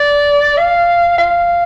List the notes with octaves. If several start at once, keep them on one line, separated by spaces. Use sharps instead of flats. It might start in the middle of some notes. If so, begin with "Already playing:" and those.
Already playing: D5
F5
F5